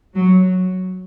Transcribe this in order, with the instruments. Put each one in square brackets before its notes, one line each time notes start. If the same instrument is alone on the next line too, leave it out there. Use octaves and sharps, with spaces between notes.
[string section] F#3